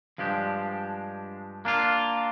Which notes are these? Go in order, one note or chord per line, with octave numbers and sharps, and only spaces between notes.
G2 F3 G#3 D4 G4
A#3 D4 F4